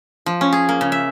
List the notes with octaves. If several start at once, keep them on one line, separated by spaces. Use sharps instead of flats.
F3
C#4
G#4
A#3
C#3
E5